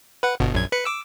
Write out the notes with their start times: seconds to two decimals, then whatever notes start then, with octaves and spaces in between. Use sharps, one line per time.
0.23 B4 F#5
0.40 G1 B2
0.54 A#1 F#2 G#6
0.72 B4 B5 C#7
0.85 D6 E6